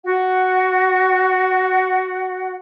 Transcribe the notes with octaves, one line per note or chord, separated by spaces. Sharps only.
F#4 F#5